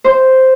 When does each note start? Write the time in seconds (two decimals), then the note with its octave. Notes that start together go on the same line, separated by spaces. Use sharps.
0.04 C5